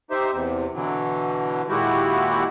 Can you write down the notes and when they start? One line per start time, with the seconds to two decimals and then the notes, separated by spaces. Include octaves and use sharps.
0.11 D#4 G4 C5 E5
0.32 E2 C3
0.74 B2 D3 E3 F#3
1.69 A#2 D#3 G#3 E4 F#4 G4